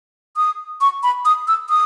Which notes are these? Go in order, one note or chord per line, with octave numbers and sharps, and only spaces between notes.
D#6
C#6
B5
D#6
E6
D#6